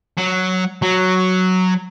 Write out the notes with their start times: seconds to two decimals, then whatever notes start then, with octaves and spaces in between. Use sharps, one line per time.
0.17 F#3
0.82 F#3